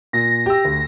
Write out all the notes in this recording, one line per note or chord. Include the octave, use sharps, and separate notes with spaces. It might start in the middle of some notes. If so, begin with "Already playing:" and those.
A#2 A#6
G4 E6
D2